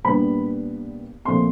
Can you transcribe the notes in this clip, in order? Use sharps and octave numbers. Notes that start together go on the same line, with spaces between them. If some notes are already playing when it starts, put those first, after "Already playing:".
A#2 G3 B3 D4 B5
A#2 F3 A3 C4 C6